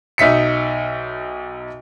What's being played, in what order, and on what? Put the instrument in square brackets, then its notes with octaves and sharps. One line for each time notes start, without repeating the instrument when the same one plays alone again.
[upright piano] B1 D#4 E5 B6 C#7